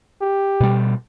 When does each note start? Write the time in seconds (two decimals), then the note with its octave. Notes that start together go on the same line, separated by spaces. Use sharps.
0.21 G4
0.60 B2 G3